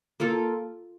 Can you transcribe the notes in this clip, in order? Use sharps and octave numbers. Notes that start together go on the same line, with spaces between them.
A#3 F4 A4